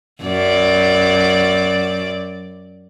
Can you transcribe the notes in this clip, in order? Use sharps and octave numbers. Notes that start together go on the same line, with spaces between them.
F#2 D5